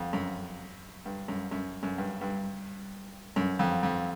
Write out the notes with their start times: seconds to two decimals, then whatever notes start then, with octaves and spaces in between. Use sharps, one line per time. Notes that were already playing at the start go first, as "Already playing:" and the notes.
Already playing: F2
0.13 F#2
1.05 G2
1.28 F#2
1.51 F#2
1.83 F#2
1.98 G2
2.21 G2
3.36 F#2
3.59 F2
3.83 F2